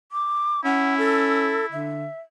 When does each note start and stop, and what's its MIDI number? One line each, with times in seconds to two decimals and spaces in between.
0.12 0.61 86
0.65 1.60 61
0.65 1.98 64
0.65 0.95 78
0.98 1.66 69
1.72 2.07 50
1.72 2.21 76